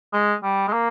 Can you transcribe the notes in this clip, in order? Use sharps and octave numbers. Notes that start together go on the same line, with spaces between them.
G#3
G3
G#3
A#3